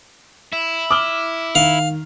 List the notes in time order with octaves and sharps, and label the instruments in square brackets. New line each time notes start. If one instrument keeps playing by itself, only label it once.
[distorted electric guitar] E4
[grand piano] D6 F6 G7
[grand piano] D#3 [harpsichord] F5